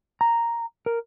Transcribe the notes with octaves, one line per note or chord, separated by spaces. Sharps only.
A#5
A#4